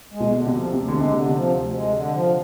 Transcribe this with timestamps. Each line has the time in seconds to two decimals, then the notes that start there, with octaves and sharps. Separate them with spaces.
0.13 G#3
0.20 B2
0.33 D3
0.46 C3
0.53 F3
0.73 D2 C3
0.88 D3
0.94 G#3
1.00 C3
1.13 D3
1.26 C3
1.34 F3
1.53 D2
1.74 G#3
1.94 D3
2.13 F3